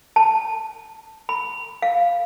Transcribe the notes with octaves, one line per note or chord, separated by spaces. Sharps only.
A5
B5
F5